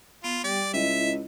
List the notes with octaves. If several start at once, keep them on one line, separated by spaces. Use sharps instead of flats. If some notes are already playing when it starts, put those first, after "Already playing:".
B3 F4
G3 G4 D5 G5
C#2 E4 D#5 E5